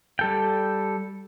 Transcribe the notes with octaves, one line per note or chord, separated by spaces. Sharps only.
G3 A4 G5